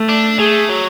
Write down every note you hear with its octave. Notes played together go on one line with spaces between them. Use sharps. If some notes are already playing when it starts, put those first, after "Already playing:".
Already playing: A3
D4
A3 G#4
F#3